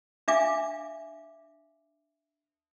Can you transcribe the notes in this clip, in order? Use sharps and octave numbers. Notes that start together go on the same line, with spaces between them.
D4 E5 F5 G#5 D6